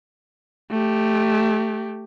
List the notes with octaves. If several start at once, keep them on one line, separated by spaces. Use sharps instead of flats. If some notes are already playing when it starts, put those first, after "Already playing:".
A3 G4